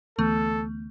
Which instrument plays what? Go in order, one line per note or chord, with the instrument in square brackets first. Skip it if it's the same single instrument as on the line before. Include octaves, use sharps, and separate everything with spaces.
[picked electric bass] D2 E3 B3 [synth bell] A3 [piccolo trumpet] A4